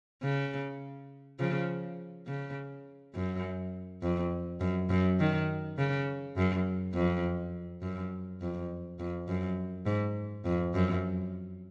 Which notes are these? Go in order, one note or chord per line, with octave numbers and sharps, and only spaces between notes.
C#3
C#3 F3
C#3
F#2
F2
F#2
F#2
D#3
C#3
F#2
F2
F#2
F2
F2
F#2
G#2
F2
F#2